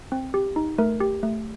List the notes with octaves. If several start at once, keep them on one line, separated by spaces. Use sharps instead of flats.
C4
G4
D#4
A3 A#4
G4
A3